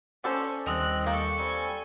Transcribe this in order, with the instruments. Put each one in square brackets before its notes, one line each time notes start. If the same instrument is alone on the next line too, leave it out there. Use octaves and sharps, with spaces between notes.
[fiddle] C#4 [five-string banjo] D4 A4 C5
[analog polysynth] D#2 G3 [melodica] C4 D#5 [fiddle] F#6
[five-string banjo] A#3 [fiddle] A4 C#6 [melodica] G5
[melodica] G3 C4 [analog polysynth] G#5